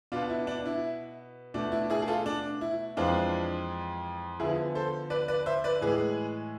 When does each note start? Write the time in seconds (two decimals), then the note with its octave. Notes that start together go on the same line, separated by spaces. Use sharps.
0.12 B2 B3 D4 F4
0.30 E4
0.47 D4
0.66 E4
1.54 B2 A3 D4
1.72 E4
1.90 E4 G#4
2.02 G#4
2.08 F4 A4
2.26 D4
2.61 E4
2.97 F2 E3 G#3 C4 D4 F4
4.40 D3 F3 B3 E4 G#4
4.75 A4 C5
5.10 B4 D5
5.28 B4 D5
5.46 C5 E5
5.64 B4 D5
5.81 A2 E3 G#3 G#4 B4